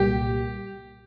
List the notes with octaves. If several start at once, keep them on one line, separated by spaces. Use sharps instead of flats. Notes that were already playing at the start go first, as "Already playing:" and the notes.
Already playing: C2 A#2 G3 A#3 G4